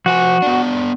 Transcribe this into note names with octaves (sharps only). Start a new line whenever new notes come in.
F3 F#4 C5 G#5
B3 D4